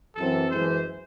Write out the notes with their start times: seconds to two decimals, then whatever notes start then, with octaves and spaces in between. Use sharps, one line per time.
0.16 F#2 E3 C4 A4
0.51 F#2 E3 G#3 C5